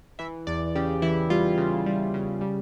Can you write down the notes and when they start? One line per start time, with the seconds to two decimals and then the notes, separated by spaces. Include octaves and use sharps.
0.19 E3 E5
0.47 E2 D5
0.75 C#3 G4
1.02 E3 E4
1.30 G3 F4
1.58 C#3
1.86 G3
2.14 C#3
2.41 G3